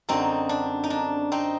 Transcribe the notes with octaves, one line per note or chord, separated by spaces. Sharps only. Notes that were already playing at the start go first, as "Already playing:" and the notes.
F#2 D3 C4 D#4
D4
D#4
D4
C4 D#4